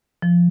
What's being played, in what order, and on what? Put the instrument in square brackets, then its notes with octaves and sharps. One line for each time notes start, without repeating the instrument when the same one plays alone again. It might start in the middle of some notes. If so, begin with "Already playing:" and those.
[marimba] F3